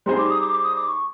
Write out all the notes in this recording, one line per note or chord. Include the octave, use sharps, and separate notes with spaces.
G3 C4 D#4 G#4 C5 C6
D6
D#6
D6
D6
D#6
D6
C#6